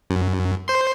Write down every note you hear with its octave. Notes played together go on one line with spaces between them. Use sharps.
F#2
C5 C6